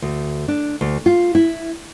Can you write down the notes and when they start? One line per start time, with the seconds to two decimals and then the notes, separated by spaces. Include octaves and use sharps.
0.02 D2
0.48 D4
0.81 D2
1.06 F4
1.35 E4